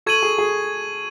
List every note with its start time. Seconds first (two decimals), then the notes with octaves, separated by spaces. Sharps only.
0.06 A4 C#6 G#6 D#7 F#7
0.22 G#4
0.38 G#4